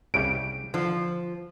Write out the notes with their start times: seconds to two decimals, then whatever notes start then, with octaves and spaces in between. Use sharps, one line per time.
0.14 C2 C#3 G4 D7
0.74 D3 F3